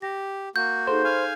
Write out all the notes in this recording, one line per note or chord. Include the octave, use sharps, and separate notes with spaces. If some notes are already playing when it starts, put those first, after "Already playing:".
G4 A#6
A#3 F#4 G6
D#4 G#4 A4 C5
F5 G#5 B5 C#6 F6